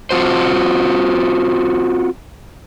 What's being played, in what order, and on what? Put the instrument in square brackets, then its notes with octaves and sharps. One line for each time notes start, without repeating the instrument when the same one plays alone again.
[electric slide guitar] C4 F4 F#4 C5